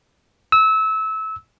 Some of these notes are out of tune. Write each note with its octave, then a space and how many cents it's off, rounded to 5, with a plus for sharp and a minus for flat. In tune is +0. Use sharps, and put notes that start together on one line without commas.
E6 -25